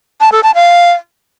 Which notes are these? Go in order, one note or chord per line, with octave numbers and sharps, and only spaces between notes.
A5
A4
A5
F5